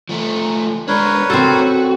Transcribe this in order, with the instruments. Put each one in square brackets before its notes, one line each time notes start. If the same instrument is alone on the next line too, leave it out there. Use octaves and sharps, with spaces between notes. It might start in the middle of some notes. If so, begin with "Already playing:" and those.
[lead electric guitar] F3 A3
[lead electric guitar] G#3 D4 [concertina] A#4 B4 C#5
[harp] C4 A4 [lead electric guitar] F#4